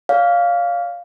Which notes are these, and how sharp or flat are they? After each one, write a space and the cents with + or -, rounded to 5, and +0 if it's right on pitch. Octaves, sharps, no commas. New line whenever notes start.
D5 -45 F5 +0